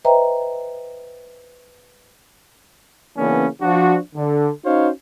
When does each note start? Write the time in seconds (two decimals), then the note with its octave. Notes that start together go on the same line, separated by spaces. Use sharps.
0.05 B4 C5 D#5 E5 G5 A#5
3.17 C#3 E3 A#3 B3 C#4 D4
3.62 F3 D4 F#4
4.16 D3
4.65 C#4 D#4 F#4 C5 C#5 F5